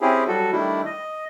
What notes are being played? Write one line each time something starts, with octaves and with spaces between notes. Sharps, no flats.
C4 C#4 E4 G4 G#4
F#3 G3 F#4 A4
D#3 G3 A3 D4 E4
D#5